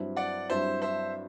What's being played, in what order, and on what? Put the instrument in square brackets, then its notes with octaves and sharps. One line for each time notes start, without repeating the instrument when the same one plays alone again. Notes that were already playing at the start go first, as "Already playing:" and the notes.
Already playing: [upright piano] G2 F#3 C4 E4
[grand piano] D5 F#5
[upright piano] G2 F#3 C4 E4 [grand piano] C5 E5
[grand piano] C5 E5